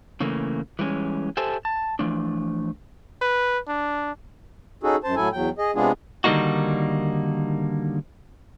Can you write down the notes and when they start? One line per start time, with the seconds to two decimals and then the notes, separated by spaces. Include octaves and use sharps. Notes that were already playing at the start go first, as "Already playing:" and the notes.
0.20 C#3 E3 A3 A#3
0.79 E3 G3 G#3 C#4
1.37 G4 A4 C5 E5 G#5 A5
1.65 A5
1.99 E3 F3 A3 D4
3.22 B4
3.68 D4
4.83 C#4 D#4 F#4 G#4 A4
5.04 F#2 C5 A5
5.16 A2 F#3 E4 A4 G#5
5.33 E2 F#3 G5
5.58 G#4 D#5
5.75 C3 G#3 B3 D4 F4 G#4
6.24 D3 D#3 G3 A#3 D#4 F#4